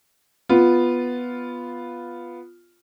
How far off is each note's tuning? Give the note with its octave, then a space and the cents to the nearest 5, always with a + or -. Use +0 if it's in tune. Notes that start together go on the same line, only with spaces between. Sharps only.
B3 +0 F4 +0